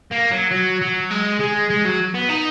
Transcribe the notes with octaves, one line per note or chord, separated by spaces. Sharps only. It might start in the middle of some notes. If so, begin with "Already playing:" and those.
A#3
F#3
F#3
F#3
G#3
G#3
G#3
F#3
B3
D#4